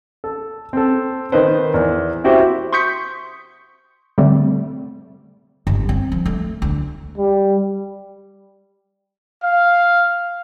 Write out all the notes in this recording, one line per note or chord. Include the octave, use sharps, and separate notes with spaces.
A4
C4 A4
D#3 D#4 B4 C5
E2
E4 F#4 G4 C5
C6 C#6 D#6 G6 B6 C#7
D3 G3 A3 C4
G1
C4
F3
A3
D2
G3
F5